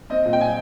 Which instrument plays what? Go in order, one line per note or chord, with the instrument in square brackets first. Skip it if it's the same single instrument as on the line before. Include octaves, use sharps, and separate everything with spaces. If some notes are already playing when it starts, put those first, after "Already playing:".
[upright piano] C4 D#5
A#2
G5
A#2 G#5